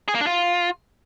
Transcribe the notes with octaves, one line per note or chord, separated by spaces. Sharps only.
G#4
A#3
D4
F4